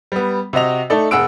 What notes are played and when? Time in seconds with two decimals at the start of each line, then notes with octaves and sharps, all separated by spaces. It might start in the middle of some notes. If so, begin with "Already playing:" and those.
0.12 G3 B3
0.53 C3 F#4 D#5 F7
0.90 A3 D#4 A4 D5
1.11 E1 G#4 F#5 E6 D7